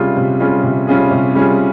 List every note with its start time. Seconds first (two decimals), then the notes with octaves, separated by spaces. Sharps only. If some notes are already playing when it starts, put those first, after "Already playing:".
Already playing: C3 G3 C#4 F4 G#4
0.17 C3
0.40 G3 C#4 F4 G#4
0.64 C3
0.87 G3 C#4 F4 G#4
1.11 C3
1.35 G3 C#4 F4 G#4